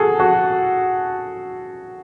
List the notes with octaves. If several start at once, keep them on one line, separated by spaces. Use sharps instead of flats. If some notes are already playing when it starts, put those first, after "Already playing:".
Already playing: F#4 G#4 A4
F#4